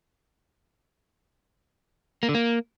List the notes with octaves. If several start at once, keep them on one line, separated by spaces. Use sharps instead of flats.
A#3
D3
A#3